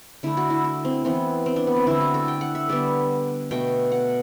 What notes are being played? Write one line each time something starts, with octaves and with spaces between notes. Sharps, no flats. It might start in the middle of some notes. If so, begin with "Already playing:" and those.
D3 A3 E4
F#4
E4
E4
C4
E3 B3 C4
C4
D4
B3
C4
D3 A3 E4
F#4
A4
G5
F#5
E5
D3 G3 B3 D5
B2 A3 G5
F#5